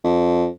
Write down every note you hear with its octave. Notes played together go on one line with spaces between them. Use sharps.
F2